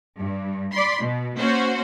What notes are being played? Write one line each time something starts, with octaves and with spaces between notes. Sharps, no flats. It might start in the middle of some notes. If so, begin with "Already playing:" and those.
G2
D5 B5 C6
B2
A#3 C#4 F#4 C5